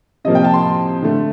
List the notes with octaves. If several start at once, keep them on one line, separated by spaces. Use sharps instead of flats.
C3 F3 A#3 D#5
G5
A5
C6
D3 A3